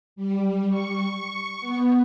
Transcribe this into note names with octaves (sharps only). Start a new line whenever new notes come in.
G3
C#6
B3